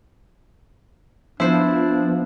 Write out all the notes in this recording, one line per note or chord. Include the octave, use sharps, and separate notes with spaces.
F3 B3 D4 E4 C5